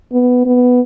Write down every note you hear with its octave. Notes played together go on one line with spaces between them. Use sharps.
B3
B3